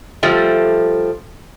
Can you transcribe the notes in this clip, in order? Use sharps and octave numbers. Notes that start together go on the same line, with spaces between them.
F3 G3 A3